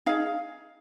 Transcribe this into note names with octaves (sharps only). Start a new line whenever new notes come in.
D#4 G#4 F5